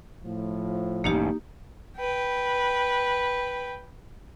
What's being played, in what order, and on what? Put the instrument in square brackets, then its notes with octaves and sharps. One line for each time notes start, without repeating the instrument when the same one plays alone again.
[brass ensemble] A2 F3
[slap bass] A1 G2 B2 [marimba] A#3 D#4 G4
[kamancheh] B4 G5